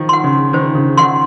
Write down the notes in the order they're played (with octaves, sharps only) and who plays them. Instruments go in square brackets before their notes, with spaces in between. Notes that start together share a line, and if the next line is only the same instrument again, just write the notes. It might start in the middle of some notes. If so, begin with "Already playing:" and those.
Already playing: [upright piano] D#3 F3
[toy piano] F#5 C6
[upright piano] C#3
[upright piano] D#3 [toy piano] C5
[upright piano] C#3
[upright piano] D#3 [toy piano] F#5 C6